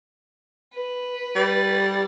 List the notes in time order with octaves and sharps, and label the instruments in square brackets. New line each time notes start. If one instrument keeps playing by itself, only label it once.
[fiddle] B4
[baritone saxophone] G3